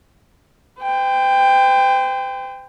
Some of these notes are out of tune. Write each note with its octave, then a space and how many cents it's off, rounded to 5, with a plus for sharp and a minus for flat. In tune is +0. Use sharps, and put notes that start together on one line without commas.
C5 -40 G5 +15